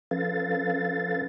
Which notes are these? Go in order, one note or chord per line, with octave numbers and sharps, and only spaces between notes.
F3 C#4 A4 B4 F5 A6